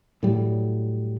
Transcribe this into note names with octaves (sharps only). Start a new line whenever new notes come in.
A2 F#3 G3